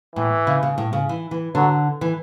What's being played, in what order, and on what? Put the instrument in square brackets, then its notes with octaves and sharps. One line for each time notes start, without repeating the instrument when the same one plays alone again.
[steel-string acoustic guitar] A2 [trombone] E3
[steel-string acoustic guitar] C#3
C#3
A2
C#3
E3
E3
[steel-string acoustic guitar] D3 [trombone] F#3
[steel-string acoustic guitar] E3